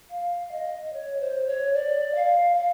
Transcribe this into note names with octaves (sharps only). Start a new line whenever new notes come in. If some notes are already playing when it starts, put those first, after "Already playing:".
F5
D#5
C#5
C5
C#5
D5
F5
F5